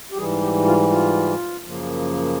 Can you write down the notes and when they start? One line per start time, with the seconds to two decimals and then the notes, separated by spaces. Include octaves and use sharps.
0.12 G4
0.17 G#2 E3 G3 G#4
0.42 G4
0.66 F4
0.91 F4
1.64 F#2 C#3 F3 A#3